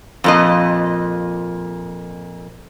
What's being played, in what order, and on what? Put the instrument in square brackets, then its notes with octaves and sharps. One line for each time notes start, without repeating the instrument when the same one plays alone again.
[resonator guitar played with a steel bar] F2 A#2 D#5